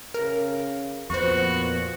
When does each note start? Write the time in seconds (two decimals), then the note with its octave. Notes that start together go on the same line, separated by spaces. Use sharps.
0.14 C#3 A#4
1.10 F2 A#2 B3 F#4 C5 C#6